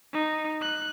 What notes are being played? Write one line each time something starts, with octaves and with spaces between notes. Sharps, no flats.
D#4
F#6